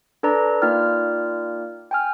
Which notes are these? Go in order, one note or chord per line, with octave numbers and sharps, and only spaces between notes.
D4 A4 B4 D5 A#5
A#3 D#4 F4 D5 G5 F6
G5 G#5 F6